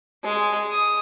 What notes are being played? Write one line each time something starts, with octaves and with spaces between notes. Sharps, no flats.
G#3
D#6